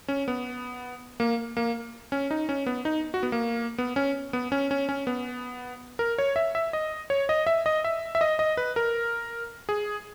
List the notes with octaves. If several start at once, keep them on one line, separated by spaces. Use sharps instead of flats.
C#4
B3
A#3
A#3
C#4
D#4
C#4
B3
D#4
F#4
B3
A#3
B3
C#4
B3
C#4
C#4
C#4
B3
A#4
C#5
E5
E5
D#5
C#5
D#5
E5
D#5
E5
E5
D#5
D#5
B4
A#4
G#4